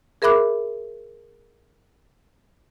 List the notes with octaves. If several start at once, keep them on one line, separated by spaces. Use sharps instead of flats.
G#4 A#4 E5 B5 D6 F#6